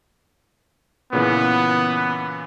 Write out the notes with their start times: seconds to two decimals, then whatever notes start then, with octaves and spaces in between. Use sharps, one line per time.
1.13 A#2 C#3 E3 B3